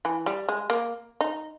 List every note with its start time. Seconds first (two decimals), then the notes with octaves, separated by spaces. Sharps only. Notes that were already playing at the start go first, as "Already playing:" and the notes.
0.05 E3
0.26 G3
0.49 G#3
0.70 A#3
1.21 D#4